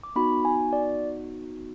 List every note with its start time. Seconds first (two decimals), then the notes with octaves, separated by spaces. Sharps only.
0.03 D6
0.16 B3 D#4 F#4 B5
0.45 G#5
0.73 D5